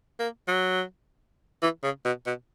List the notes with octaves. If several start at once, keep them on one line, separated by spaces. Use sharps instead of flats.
A#3
F#3
E3
C#3
B2
B2